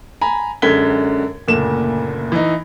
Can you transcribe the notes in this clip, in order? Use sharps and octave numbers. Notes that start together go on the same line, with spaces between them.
G#5 A#5 B5
F#2 D3 G#3 G#6 B6 G7
F#1 D2 A#2 E7
E3 D#4